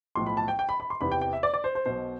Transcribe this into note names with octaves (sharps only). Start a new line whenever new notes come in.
B1 A2 F3 C6
B5
A5
G5
G5
B5
B5
C6
E2 C3 E3 B5
G5
G5
E5
D5
D5
C5
C5
B1 B2 C5